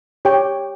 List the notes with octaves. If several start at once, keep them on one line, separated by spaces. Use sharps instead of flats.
G4 C#5 G5